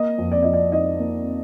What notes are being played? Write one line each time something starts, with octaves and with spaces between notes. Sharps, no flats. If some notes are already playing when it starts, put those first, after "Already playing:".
Already playing: A#3 D#5
F2
D5
F3 D#5
D5
D#4 D#5
A#3